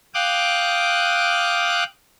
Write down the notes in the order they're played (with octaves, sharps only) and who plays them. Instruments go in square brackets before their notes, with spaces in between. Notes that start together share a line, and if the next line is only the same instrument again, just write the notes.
[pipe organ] F5 G5 D6 D#6 F#6